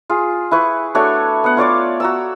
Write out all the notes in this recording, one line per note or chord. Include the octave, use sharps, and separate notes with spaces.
F4 G#4
E4 B4 C#6
A3 D4 F#4 C#5
B3 F#5
F4 C#5 D5 D6
F#4 A#5 E6